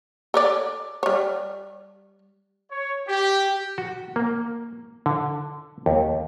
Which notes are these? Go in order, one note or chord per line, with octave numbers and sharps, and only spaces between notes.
A4 C#5 D5
G3 C#5
C#5
G4
F#4
A#3
D3
D#2